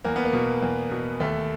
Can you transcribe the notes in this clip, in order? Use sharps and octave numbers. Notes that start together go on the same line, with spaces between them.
E2 A#3
B3
A#3
B2
E2
B2
D#2 A3